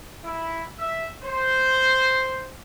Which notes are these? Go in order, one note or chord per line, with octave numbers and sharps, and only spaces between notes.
E4
E5
C5